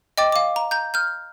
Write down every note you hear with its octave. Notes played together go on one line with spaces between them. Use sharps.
D#5 G5 D6 A6
F5 D6
A#5
A#5 G6
F6 G6